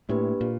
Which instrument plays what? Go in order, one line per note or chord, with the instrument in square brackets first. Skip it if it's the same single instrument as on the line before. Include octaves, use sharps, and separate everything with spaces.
[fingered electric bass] A2 [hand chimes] A#3 D4 G4 B4
[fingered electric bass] A#2